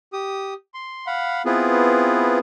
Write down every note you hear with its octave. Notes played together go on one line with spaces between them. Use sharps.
G4 D#6
C6
F5 F#5 B5
B3 C4 E4 F4 G#4 B4